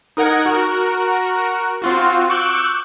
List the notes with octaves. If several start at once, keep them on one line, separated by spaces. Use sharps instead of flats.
D#4 A#4 F#5 G#6
F#4 A#4
C4 F4 F#4
C#6 D6 E6 F#6 G6